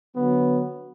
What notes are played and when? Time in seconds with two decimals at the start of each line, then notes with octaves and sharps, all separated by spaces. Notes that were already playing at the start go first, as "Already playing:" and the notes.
0.16 D3 F#3 B3